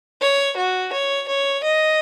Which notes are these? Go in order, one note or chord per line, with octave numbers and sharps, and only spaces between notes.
C#5
F#4
C#5
C#5
D#5